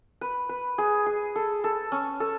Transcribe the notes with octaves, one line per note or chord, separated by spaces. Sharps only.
B4
B4
G#4
G#4
A4
A4
C#4
A4